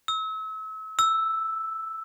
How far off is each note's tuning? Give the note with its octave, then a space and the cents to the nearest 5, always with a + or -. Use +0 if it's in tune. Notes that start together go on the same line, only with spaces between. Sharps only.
E6 -35
E6 +0